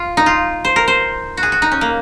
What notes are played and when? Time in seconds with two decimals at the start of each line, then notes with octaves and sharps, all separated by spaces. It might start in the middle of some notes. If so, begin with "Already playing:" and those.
Already playing: F4
0.17 D#4
0.26 F4
0.65 C5
0.76 A#4
0.88 C5
1.37 F#4
1.43 G#4
1.52 F#4
1.62 D#4
1.71 C#4
1.81 A#3